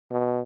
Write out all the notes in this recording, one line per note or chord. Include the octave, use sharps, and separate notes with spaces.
B2